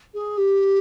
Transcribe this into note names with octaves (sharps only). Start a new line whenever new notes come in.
G#4
G4